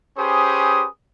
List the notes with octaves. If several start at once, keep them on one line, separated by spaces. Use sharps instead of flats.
C#4 G4 G#4 B4 C5 D#6